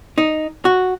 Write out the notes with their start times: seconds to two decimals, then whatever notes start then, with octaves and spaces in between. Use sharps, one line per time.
0.18 D#4
0.65 F#4